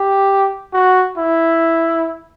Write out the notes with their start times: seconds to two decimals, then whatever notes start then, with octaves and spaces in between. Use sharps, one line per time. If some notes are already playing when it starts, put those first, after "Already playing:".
Already playing: G4
0.73 F#4
1.17 E4